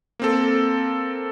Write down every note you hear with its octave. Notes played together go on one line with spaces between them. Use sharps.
A#3 C4 A4